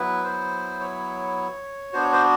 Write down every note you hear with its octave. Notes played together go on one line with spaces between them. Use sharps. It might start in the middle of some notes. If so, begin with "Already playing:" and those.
Already playing: F#3 B3 E4 B4
C5
C#5
B3 D4 F#4 C5
C#5
C5